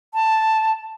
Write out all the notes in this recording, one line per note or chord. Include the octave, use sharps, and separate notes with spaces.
A5